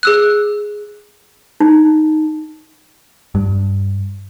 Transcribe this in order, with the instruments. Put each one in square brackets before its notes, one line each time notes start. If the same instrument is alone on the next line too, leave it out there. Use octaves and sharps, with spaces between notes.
[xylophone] G#4 E6 F#6
[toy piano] D#4
[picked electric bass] G2